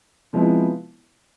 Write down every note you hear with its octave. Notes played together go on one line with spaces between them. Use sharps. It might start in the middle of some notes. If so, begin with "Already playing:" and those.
C3 F3 G#3 B3 E4